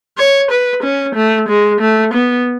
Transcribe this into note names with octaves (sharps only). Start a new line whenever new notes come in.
C#5
B4
C#4
A3
G#3
A3
B3